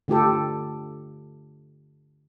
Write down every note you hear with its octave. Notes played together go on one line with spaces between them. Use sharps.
D3 A3 F4 G4 A4